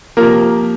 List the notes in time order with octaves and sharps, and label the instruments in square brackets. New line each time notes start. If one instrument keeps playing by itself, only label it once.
[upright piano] C3 F3 A#3 A#4